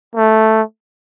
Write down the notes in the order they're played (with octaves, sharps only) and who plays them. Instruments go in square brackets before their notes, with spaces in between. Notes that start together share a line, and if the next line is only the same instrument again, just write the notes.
[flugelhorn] A3